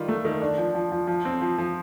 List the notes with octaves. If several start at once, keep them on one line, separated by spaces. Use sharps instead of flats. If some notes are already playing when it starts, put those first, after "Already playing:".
Already playing: D#3 G3 F4
A3
D#3
D4
F3
F3
F3
F3
C4
F3
F3